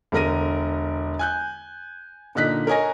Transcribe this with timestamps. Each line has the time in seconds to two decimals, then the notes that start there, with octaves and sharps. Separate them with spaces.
0.12 E1 D3 A#4 A#6 D#7
1.19 G#5 F#6 G6
2.35 A#2 D3 D#4 F#6 B6
2.67 A#4 C#5 D#5 G#5 A#6